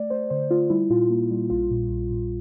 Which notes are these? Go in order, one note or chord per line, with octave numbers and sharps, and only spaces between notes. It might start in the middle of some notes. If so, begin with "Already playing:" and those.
Already playing: A3 D5
A3 C5
D3 C5
A3 F4
G3 E4
A#2 F4
A#3
G3
A#1 F4
A#2
A#1
A#2